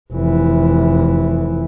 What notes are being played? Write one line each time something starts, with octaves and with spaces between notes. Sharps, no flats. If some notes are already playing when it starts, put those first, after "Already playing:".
F1 E3